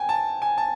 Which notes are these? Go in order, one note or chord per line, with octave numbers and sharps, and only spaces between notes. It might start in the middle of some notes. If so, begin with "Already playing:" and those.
Already playing: G5 G#5
A5
G#5
A5